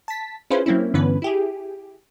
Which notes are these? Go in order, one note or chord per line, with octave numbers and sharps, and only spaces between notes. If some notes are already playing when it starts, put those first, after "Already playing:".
A5 B6
C#4 E4 F4 G#4 B4 C5
F#3 A#3 C4 C#4 E4
G2 D3 E3 B3 C#4 B4
E4 G4 G#4